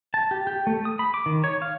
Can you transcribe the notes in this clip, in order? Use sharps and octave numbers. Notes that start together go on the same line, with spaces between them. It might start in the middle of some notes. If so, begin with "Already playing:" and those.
A5
G4
G4
A3
D#6
B5
D6
D#3
C#5
F5